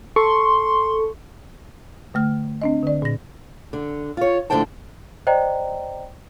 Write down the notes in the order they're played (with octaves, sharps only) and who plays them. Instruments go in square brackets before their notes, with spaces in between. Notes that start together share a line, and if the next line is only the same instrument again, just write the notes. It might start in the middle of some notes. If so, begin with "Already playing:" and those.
[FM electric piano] A4 C#6 [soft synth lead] C6
[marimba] D3 A3 F6
C4 D4 D#5
D3 D5
A#2 A#6
[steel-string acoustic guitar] D3
F4 C#5
A2 D3 F3 C5 G5 A5
[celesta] C5 D5 D#5 G5 A#5